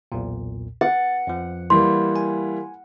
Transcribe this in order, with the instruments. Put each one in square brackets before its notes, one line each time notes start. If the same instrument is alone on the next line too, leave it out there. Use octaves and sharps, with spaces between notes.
[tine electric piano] B1 E2 A#2
[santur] F#5 [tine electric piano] A6
[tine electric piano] F2 F3
[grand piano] E3 G3 A#3 [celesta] C6
[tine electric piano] G#5